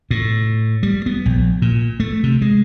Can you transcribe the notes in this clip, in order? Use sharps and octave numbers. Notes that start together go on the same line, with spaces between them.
A2
G3
B3
A#1
A#2
A3
C3
G#3